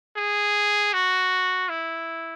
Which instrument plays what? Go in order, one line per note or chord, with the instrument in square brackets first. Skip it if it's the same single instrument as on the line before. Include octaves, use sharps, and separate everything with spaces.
[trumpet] G#4
F#4
E4